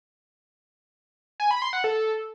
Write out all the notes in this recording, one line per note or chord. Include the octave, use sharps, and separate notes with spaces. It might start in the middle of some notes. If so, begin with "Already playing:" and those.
G#5
B5
C6
F#5
A4